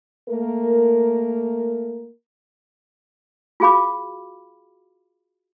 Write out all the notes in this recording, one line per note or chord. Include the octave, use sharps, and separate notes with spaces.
A3 A#3 A#4
F4 F#4 G#4 F5 B5 D6